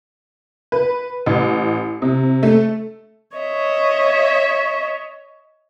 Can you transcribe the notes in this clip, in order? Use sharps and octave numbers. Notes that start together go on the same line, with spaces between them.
B4
A1
C3
A3
C#5 D#5 E5